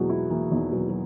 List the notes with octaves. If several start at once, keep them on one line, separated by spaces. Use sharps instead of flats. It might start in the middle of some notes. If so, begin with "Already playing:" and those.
Already playing: E2 B2 E3 F#3 G#3 A#3
E4
E3 A#3
E2 D#3
B2 F#3
F#3